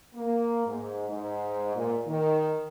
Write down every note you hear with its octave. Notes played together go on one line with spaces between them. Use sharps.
A#3
G#2
G#2
A#2
D#3